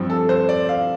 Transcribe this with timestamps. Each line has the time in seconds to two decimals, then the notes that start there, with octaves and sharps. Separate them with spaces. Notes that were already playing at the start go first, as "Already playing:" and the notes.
Already playing: G2 F3 C4
0.10 A4
0.29 C5
0.49 D5
0.69 F5